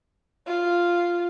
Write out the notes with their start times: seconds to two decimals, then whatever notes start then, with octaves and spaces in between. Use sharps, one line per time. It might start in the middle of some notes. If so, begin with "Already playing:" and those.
0.47 F4